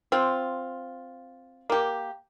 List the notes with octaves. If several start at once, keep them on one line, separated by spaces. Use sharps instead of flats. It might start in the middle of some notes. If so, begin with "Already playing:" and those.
C4 F4
A#3 G4